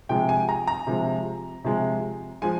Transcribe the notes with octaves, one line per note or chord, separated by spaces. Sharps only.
C3 F3 G#3 G5
G#5
A#5
A#5
C3 F3 G#3
C3 F3 G#3
F3 G#3 G#5